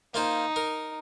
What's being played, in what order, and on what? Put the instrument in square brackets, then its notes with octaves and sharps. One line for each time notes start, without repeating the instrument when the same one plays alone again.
[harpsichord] A#3 F4 C5 [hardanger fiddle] D#4
[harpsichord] A#4